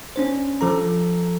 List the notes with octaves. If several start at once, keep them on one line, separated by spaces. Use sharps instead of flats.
C#4 D4 C5
F3 A4 A#5